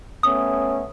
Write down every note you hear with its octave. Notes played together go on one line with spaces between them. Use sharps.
A3 B3 C#4 D#6